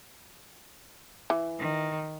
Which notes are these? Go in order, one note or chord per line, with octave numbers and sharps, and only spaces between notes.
E3
D#3